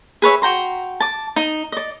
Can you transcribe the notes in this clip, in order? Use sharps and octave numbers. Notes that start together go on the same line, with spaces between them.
G#4 B4 C#5 E5
F#4 G5 A#5 C6
A5 D6
D#4
D5 D#5